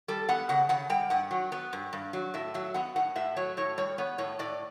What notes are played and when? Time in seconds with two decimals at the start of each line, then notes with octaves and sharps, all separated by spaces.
0.08 G3 A4
0.29 B3 F#5
0.49 C#3 F#5
0.69 C#3 F#5
0.90 G3 G5
1.10 G2 F#5
1.31 F#3
1.52 B3
1.73 G2
1.93 G2
2.13 F#3
2.34 A2 E5
2.54 F#3 E5
2.74 B3 F#5
2.96 A2 F#5
3.15 A2 E5
3.36 F#3 C#5
3.57 A2 C#5
3.78 G3 C#5
3.98 B3 C#5
4.18 A2 C#5
4.39 A2 D5